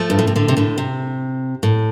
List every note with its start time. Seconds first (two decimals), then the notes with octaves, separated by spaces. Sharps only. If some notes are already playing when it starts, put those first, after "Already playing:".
Already playing: F3 A3
0.10 G2
0.19 A2
0.27 C3
0.36 A2 D3
0.48 C3
0.57 A2 D3
0.78 C3
1.63 A2